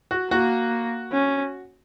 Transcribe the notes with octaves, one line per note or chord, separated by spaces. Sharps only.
F#4
A#3 F#4
C#4